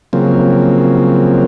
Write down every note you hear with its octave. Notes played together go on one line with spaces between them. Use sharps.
C#3 F3 F#3 A#3 C4